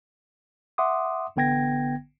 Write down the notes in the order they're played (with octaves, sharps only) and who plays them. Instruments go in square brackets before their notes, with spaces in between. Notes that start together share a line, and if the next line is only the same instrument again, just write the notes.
[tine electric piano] E5 F#5 C6 D6 D#6
A1 D3 B3 G5 G#6 A#6